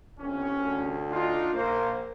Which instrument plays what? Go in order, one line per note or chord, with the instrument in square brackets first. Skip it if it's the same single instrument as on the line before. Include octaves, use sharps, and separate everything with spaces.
[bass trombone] G1 [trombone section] C2 C#4
[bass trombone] D2
[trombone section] D4 D#4 F4
[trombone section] A#1 C5 [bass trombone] A#3